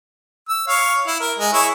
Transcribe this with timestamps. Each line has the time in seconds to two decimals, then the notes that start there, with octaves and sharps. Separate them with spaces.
0.49 E6
0.68 C#5 F5
1.07 E4
1.20 A#4
1.39 G#3
1.53 E4 G#4 C#5